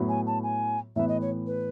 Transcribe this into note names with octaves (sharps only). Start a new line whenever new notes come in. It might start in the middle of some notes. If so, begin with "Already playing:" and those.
Already playing: A2 F#3 B3 E4
G#5
A5
G#5
A2 E3 B3 E5
D#5
C#5
B4